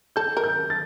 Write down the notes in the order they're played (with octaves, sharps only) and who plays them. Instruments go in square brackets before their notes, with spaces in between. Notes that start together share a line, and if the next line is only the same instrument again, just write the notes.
[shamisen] A4 [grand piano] G6
[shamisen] A#4
[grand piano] G6
A6